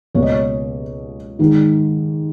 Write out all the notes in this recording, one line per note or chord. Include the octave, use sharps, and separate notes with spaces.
C#2 B2 A#3 C#5
D#5
C#5
G#2 D#3 G#3